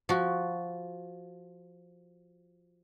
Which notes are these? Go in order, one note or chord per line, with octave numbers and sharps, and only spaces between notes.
F3 F#4